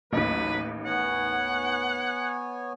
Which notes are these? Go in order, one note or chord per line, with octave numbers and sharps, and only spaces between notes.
A1 D#2 F#3 B4
B3 C#5 F#5 G#5